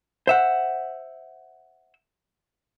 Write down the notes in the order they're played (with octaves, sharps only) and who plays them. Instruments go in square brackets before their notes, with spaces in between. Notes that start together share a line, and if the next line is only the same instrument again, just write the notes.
[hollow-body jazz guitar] C5 E5 F#5